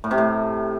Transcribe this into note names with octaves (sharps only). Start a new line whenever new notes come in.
A2
C3
A2